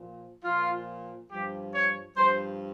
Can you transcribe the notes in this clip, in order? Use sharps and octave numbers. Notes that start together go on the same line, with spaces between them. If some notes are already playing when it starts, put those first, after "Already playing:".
Already playing: A#2 F3
A#2 F3 F4
G2 F3 G4
C#5
G2 F3 C5